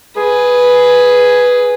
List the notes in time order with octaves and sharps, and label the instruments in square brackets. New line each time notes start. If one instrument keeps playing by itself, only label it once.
[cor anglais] G#4 [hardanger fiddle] B4